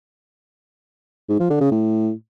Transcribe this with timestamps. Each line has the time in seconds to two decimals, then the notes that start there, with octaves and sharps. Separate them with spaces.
1.29 G#2
1.40 F3
1.50 D3
1.61 C#3
1.71 A2